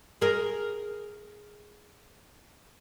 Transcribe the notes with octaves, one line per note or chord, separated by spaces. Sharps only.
G#4 A#4